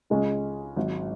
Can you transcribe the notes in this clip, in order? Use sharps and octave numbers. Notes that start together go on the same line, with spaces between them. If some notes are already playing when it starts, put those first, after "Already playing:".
C#2 C#3 G#3 C#4
G#1 G#2 F#3